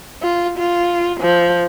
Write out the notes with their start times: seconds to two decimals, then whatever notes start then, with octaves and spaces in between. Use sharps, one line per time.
0.23 F4
0.58 F4
1.21 F3